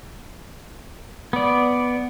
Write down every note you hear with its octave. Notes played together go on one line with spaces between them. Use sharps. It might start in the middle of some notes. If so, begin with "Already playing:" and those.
B3 D5